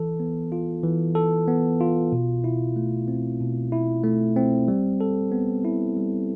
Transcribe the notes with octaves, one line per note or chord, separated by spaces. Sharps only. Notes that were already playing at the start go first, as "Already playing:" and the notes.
Already playing: E3 A4
B3
F4
E3
A4
B3
F4
B2
E4
A3
C4
B2
E4
A3
C4
G3
A4
B3
E4
G3